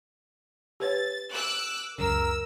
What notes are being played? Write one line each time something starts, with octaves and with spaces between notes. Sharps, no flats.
G4 B4 C#5 A6
D6 E6 F#6
C#2 F#2 C#3 A#4 E6